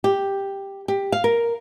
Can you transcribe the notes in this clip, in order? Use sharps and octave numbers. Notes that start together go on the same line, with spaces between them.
G4
G4
F5
A#4